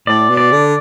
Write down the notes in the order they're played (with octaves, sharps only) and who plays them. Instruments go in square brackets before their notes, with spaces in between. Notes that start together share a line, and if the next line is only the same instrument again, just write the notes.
[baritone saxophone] A2 [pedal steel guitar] D5
[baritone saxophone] B2
[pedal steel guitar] D5
[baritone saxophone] D3